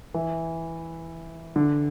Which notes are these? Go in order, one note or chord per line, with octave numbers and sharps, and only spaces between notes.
E3
D3